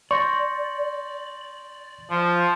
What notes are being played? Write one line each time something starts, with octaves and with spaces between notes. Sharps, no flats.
D5 C6 C#6 G6 A#6
F3